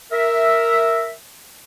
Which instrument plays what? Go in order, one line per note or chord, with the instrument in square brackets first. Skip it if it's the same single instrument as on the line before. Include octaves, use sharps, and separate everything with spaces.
[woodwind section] A#4 E5